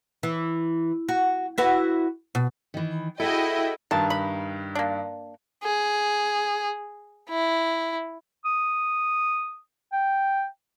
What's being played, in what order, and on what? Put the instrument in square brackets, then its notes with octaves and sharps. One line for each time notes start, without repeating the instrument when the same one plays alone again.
[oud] E3
F#4
E4 F#4 B4
B2
[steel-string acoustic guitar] D#3 E3
[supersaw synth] E4 [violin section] F#4 D#5 G5 [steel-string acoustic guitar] G#4 A4
[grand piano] G2 D#3 [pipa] A5
[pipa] B5
A#3 D4
[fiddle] G#4
E4
[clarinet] D#6
G5